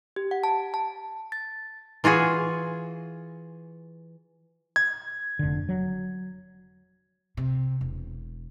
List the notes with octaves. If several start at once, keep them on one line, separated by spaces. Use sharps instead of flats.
G4
F#5
A5
A5
A6
E3 F4 F#4 G#4
G#6
F1 D3
F#3
C3
E1